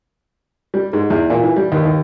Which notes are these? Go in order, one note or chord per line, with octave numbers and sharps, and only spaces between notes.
G3
G#2
E2
A#2
E3
G3
D#2
D#2